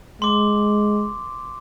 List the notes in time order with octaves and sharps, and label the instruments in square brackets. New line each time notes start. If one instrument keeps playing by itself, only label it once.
[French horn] G#3 [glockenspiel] C6 D6